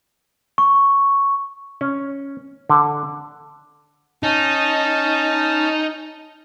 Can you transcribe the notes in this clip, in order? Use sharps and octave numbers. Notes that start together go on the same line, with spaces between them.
C#6
C#4
D3
C#4 D#4 A5